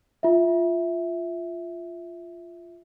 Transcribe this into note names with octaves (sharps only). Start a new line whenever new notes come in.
F4 E5